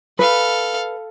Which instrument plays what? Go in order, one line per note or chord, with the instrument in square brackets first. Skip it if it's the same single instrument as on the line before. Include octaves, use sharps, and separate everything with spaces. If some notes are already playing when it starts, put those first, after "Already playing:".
[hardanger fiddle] A4 F5 [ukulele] B4